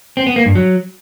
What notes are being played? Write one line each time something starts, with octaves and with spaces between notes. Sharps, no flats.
C4
B3
A#3
G2
F#3